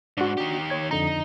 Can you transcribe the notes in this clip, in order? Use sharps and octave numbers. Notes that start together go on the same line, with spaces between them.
G#2 D4 F#4
D#3 G4
C#5 G#6
F2 D3 D#4 A#5